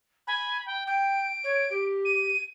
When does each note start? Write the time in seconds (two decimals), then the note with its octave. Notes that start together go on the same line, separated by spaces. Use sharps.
0.27 G#5 B5
0.66 G5
0.87 G5 D7
1.44 C#5
1.70 G4
2.05 D#7